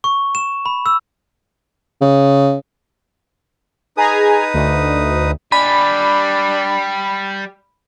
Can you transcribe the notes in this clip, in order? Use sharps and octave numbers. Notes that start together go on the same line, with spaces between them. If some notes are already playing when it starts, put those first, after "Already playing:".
C#6
E7
B5
E6
C#3
D#4 G#4 B4 G#5 A#5 D#6
D2
G3 D4 G#5 B5